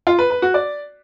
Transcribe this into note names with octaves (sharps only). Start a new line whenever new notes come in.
F4
B4
B4
F#4
D5